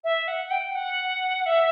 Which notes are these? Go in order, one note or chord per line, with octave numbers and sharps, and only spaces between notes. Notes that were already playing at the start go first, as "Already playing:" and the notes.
E5
F#5
F#5
G5
F#5
E5